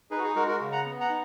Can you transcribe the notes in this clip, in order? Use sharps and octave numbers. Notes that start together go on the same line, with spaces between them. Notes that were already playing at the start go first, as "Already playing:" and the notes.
D#4 G#4 B4
F#4
G#4
G#3 F#4 A#4
F#4 A#4
C#3
F#5 A#5
B3
F#5 A#5
D#4